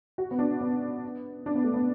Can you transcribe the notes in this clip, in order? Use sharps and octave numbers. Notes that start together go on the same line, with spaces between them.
F#4
B3
D4
B3
D4
B3
A3
B3